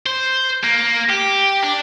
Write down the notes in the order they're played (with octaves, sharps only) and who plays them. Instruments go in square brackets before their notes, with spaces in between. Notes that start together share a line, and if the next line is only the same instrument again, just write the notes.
[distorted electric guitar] C5
A#3
G4
D4